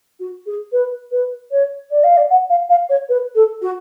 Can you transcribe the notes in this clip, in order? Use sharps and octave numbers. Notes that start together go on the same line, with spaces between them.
F#4
G#4
B4
B4
C#5
D5
F5
D5
F#5
F5
F5
C#5
B4
A4
F#4